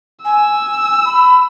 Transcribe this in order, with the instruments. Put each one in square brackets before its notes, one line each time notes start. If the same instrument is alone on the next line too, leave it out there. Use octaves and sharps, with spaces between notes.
[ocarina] G#5 [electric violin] E6
[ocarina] B5